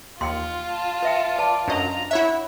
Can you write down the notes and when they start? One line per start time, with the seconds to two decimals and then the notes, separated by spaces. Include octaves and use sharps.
0.21 D#2 F4 G5 C6
0.70 A5
1.03 B4 E5 G5
1.38 B4 D5 A5
1.68 F#2 D4 D#5 A#5
2.11 E4 C#5 E5 F#5